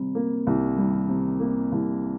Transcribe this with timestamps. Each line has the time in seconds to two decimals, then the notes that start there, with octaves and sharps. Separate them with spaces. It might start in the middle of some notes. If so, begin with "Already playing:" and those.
Already playing: C3 G3
0.15 A#3
0.47 C2
0.77 G3
1.09 C3
1.40 A#3
1.72 C2